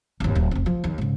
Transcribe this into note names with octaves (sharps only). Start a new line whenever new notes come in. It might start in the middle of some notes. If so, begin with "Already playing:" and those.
G#1 D#2
D1
F1 C4
F3
D#2
G#2 C#3